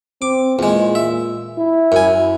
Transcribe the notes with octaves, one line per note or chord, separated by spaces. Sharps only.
C4 D6
E2 A#2 G#3
E5
E4
F#2 G#5